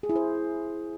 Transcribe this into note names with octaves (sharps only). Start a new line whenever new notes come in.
G#4
E4
C5